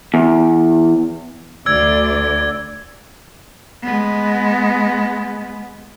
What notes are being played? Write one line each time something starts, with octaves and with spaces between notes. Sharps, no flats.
E2
D2 D5 E6 G#6
G#3 B3